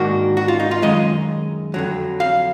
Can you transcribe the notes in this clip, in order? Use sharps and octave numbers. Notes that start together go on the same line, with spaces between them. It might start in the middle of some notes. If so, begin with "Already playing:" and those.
Already playing: G#2 D#3 A#3 D4 F#4
F#4
F4
D#4
F4
F#2 D#3 G#3 D#5
F2 D3 F#3
F5